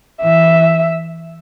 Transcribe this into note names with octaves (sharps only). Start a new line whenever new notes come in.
E3 E5